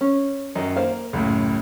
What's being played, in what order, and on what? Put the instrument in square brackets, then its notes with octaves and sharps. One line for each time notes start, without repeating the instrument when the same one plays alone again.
[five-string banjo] C#4
[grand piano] F#2 D#3 [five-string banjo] D#5
[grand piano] A#3 [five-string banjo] C5 F5
[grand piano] C#2 F#2 A2 [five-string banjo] G4